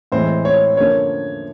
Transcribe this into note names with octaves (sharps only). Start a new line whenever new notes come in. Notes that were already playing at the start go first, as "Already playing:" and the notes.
A2 E3 G#3 C4 C5
C#5
D3 F3 A#3 C#4 C#5